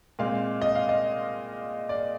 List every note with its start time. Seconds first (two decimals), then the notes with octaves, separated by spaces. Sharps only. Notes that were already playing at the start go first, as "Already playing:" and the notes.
0.19 A#2 G#3 C4 F5
0.62 D#5
0.75 F5
0.89 D#5
1.89 D5